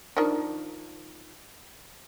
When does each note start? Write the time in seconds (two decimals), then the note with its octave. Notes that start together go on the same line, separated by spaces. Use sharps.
0.17 D#3 F3 D4